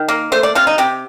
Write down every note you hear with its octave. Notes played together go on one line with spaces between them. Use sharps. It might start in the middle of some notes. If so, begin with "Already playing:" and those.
Already playing: D#3
A#3
A3 C5
D5
C3 F4
D#4
C3 G4